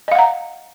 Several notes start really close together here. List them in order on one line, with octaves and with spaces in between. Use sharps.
D#5 F5 F#5 A#5